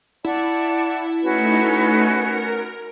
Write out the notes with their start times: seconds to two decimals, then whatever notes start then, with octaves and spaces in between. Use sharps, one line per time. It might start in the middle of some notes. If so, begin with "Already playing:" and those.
0.25 E4 D5 F#5 A5
1.22 A3 C#4 D#4 F#4 B4
2.13 A#4